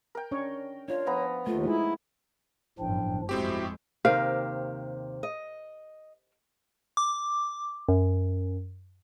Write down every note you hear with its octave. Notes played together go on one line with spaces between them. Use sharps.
A#4 G5
C#4 D4 C#5
D4 F4 C#5
F3 B3 A#5
D#2 A3 F4
G#3 D#4 E4 G#4
G1 F#2 A2 F3 D4 G5
F2 A2 G#3 C4 E4 F#4 G4
D#2 C3 G4 A#4 C5 F5
D#5
D6
F#2